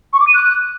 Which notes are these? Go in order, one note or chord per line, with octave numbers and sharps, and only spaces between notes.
C#6
D6
D#7
F#6